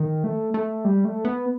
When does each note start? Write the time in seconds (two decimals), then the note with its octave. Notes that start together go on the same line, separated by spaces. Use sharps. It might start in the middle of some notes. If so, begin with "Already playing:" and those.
Already playing: D#3
0.24 A3
0.54 A3
0.85 G3
1.05 A3
1.25 B3